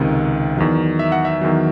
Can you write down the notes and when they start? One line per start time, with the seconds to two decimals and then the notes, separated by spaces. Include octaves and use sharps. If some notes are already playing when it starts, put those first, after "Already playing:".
Already playing: C#2 C3 D#3
0.57 E2 D#3 F#3
0.99 E5
1.12 F#5
1.25 E5
1.41 E2 D#3 F#3